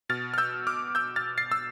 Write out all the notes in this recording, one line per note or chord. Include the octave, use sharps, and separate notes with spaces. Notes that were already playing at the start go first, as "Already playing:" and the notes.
B2 F6 A6
F6
E6 G6
D6 F6
E6 G6
F6 A6
A6 C7
E6